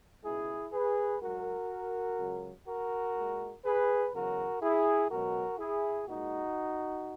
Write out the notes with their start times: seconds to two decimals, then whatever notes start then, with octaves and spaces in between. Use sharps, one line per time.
0.24 C#2 B2 G#3 E4 G#4
0.72 G#4 B4
1.21 G#2 F#3 F#4 A#4
2.18 C#2 C#3 F#3
2.67 F#4 A#4
3.16 A#2 G#3
3.65 G#4 B4
4.13 E2 C#3 F#3 F#4 A#4
4.62 E4 G#4
5.10 C#2 B2 F#3 F#4 A#4
5.59 E4 G#4
6.07 A#2 G#3 D#4 F#4